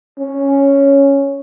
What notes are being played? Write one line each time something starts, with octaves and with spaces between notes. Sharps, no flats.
C#4